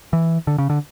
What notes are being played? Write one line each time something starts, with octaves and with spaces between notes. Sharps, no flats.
E3
D3
C#3
D3